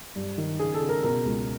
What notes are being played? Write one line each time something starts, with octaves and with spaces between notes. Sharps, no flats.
G2
D#3
C#3 G#4
A4
C#3
A#4
B2 A#4
C#2